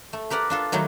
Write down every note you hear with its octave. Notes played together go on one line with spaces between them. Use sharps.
A3
G4 A#4 B4 D5 F#5
D4 F4 A4
D#3 F#3 G3 A3